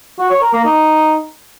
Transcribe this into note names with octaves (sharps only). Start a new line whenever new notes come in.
F#4
C#5
A#4
A#3
D#4